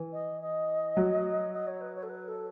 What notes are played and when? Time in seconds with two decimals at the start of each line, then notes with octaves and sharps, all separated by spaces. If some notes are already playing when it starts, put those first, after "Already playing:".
Already playing: E3
0.12 D#5
0.41 D#5
0.97 F#3
1.52 D#5
1.66 C#5
1.80 B4
1.94 C#5
2.02 A4
2.09 B4
2.27 A4